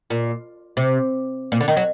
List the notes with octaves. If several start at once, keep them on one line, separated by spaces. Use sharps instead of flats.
A#2
C3
A#2
D3
D#3
F#3